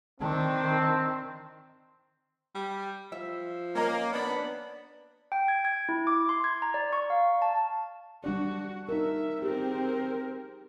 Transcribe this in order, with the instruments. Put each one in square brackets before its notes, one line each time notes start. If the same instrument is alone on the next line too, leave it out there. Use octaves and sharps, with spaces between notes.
[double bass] D#3 [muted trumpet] C4 [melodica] D4
[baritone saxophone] G3
[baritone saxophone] F3 [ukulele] E5
[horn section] A#3 [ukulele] C#4 D#5 A#5
[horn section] B3 D4 B5
[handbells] G5
G#6
G#6
E4
D6
C6
G#6
A#5
D5
C#6
F5
A5
[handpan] G3 D4 D5 [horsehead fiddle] F#4
[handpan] D#4 A#4 [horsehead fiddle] E5
[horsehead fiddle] C4 A#4 [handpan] G4 G#4